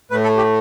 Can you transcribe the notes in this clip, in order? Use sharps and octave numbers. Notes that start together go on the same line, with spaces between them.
A2 A3 B4
A4
G4